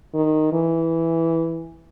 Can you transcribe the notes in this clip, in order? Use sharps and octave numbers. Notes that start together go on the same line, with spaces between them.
D#3
E3